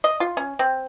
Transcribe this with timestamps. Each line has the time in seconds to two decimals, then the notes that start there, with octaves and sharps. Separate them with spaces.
0.04 D#5
0.20 F4
0.37 C#4
0.59 C4